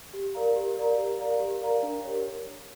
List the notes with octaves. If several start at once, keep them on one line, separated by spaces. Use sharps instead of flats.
G4
A#4 D5 F5 A#5
G4
A#4 D5 F5 A#5
G4
A#4 D5 F5 A#5
G4
A#4 D5 F5 A#5
D4
G4 A#4 C#5